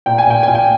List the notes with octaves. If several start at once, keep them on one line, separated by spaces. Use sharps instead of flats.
A#2 G5
G#5
A#2 G5
A#2 G#5
G5